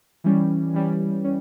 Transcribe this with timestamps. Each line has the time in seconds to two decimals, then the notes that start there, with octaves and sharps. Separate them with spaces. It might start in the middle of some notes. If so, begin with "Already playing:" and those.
0.24 E3 G3 C#4
0.74 E3 G3 C#4
1.24 C#4